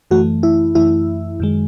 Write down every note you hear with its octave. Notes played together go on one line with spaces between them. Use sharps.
F#2 E3 A3 F#4
E4
F#2 E3 A3 E4
F#2 D#3 G#3